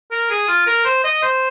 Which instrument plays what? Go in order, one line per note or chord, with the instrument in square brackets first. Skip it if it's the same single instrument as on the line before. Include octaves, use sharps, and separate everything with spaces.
[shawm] A#4
G#4
F4
A#4
C5
D#5
C5